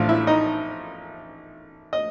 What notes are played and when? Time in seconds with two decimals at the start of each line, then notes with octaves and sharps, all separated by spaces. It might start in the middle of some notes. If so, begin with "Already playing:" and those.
Already playing: A1 A2 F3 A3 D4 F4 F5
0.09 E4 E5
0.27 D#4 D#5
1.93 D#5